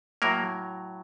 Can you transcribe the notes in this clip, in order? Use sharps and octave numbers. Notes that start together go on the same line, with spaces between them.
A2 F#3 A#3 A#4